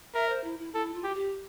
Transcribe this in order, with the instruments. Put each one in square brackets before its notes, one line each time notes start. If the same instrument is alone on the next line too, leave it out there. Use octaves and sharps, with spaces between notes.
[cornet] A#4 [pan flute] E5
[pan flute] C5
E4
E4
[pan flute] E4 [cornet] A4
[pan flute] F4
[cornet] G4
[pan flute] F4
G4